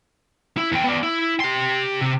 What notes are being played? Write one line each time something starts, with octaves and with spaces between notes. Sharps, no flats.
E4
E2 G5
B3 D5
E4
G4 C6
C3